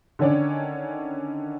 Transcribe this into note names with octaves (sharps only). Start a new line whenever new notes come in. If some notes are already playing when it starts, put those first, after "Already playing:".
D3 D#3 C#4 C#5 D5